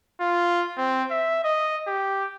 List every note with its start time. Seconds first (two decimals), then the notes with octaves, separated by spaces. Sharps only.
0.21 F4
0.77 C4
1.11 E5
1.44 D#5
1.87 G4